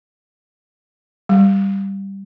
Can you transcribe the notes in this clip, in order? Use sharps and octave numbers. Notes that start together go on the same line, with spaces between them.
G3